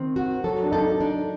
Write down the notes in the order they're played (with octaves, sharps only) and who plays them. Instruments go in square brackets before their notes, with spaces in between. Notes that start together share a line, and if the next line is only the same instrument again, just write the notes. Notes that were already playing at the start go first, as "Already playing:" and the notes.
Already playing: [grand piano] D#3 [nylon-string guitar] C4
[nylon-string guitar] F#4
[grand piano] F#3 [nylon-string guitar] A4
[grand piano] D4
[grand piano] D#4 [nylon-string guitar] A4
[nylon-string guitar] D4